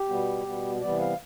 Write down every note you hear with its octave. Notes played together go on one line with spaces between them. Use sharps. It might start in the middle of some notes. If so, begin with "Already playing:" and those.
Already playing: G4
B2 G3 B3
B2 G3 B3
C3 E3 G3 B3 D5
F5